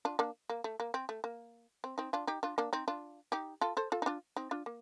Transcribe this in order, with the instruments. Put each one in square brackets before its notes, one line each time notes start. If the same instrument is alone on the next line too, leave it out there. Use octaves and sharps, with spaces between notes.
[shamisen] D4 F4
A#3 D4
A#3
A3
A#3
C4
A3
A#3
C4
C4 D#4
D4 F4
D#4 G4
D4 F4
A#3 D4
C4 D#4
D4 F4
D#4 G4
F4 A4
A4 C5
F4 A4
D#4
D4 F4
C4 D#4
D4 F4
A#3